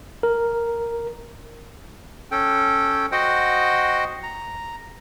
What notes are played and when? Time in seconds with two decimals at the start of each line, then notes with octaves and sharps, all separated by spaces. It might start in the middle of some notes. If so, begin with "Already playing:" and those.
0.23 A#4
2.31 C#4 A4 G5
3.12 F#4 C5 D#5 F#5 G5
4.23 A#5